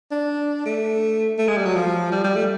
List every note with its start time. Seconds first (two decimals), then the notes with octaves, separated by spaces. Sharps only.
0.11 D4
0.65 A3
1.38 A3
1.48 G#3
1.57 G3
1.65 F#3
1.75 F3
2.12 G3
2.24 G3
2.36 A3